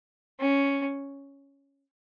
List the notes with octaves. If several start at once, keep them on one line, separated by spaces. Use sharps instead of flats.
C#4